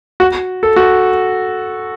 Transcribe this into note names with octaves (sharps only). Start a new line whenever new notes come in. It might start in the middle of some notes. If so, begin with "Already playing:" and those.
F#4
A4
F#4